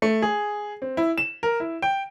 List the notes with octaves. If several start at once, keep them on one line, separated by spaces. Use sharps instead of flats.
A3
G#4
C4
E4
E7
A#4
E4
G5